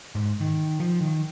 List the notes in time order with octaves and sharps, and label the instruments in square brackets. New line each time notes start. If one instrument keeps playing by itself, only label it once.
[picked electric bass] G#2
D#3
F3
D#3